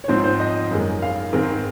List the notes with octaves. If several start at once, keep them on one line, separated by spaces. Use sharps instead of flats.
C#5
G#2 F3 C4 D#4 C5
C5
D#5
F#2 D#3 G#3
F5
G#2 D#3 G#3 C4